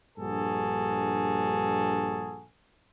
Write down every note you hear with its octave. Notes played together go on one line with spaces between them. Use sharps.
A#1 G2 F#4 G#4 A4